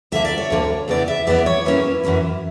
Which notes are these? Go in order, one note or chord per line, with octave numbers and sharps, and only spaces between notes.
D2 D3 A#3 E5
D5
C#5
D2 D3 A#3
E2 C#3 E3 B3 E4 D5
E5
E2 C#3 E3 B3 E4 D5
C#5
F#2 E3 A#3 C#4 E4 B4
F#2 E3 A#3 C#4 E4